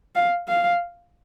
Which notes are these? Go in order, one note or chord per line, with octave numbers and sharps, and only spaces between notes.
F5
F5